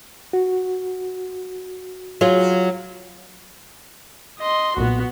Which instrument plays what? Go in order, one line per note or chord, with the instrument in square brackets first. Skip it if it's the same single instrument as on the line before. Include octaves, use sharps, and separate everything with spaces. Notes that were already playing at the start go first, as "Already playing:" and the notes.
[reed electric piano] F#4
[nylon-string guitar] F#3 F4 G#4
[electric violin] D#5 C6
[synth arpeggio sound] B1 A#2 [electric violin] B3 F#4